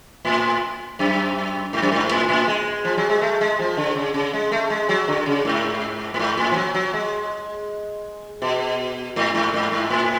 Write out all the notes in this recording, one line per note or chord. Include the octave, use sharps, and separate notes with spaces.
A2
F#2
G#2
F#2
G#2
A2
A2
G#3
F3
F#3
G#3
A3
G#3
F3
D3
C#3
C#3
G#3
A3
G#3
F#3
D3
C#3
G#2
A2
G#2
A2
F3
F#3
F#3
G#3
B2
G#2
G#2
G#2
G#2
A2